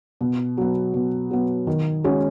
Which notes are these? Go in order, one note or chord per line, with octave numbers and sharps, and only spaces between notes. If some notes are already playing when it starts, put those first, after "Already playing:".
B2
F#3 B3
B2
F#3 B3
D#3
G#3 C#4 F#4